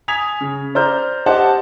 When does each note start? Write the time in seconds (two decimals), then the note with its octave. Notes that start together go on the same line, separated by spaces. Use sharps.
0.08 G#5 D#6 G#6 B6 F7
0.41 C#3
0.75 C5 D5 A#5 F6 G6
1.26 G4 C5 D#5 F#5 A5